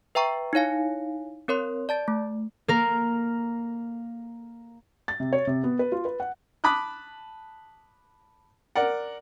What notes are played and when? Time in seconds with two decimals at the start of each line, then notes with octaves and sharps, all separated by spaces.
0.15 B4 E5 G5 A#5 C#6
0.53 D#4 E4 C#5 F5 G#5
1.48 C4 A#4 C#5 C6
1.89 D5 A5 A6
2.08 A3
2.68 A#3 A#4
5.08 A6
5.20 C3
5.33 C#5
5.47 C3
5.64 B3
5.79 B4
5.92 F4
6.05 B4
6.20 F#5
6.64 A5 B5 D6 D#6 F#6
8.75 A#4 D5 F#5